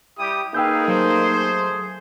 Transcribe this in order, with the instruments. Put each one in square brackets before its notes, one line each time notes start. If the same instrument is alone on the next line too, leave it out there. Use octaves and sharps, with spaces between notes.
[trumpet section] G3 E4 D#6 [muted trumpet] G4
[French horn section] A#3 D#4 [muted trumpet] G#4 [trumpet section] B4 F5 [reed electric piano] G5 E6 G6
[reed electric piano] F#3 [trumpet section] A3 C5